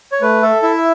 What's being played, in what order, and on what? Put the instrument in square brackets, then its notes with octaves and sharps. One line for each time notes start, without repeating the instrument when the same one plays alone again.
[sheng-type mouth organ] C#5
A3 B4
A4 E5
E4 E5